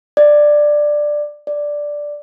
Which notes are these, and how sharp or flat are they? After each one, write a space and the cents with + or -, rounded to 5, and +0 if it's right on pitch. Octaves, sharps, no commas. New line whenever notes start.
D5 +10
D5 +0